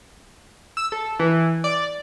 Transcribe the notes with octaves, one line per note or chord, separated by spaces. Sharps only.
E6
A4
E3
D5